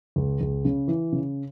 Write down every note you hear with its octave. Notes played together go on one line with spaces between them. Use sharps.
C#2
C#2
C#3
E3
C#3